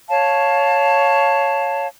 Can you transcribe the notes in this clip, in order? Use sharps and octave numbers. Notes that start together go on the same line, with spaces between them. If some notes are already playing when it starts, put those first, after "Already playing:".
C#5 F5 A5